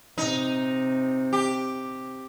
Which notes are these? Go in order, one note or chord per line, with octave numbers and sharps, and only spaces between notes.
C3 D#4
G4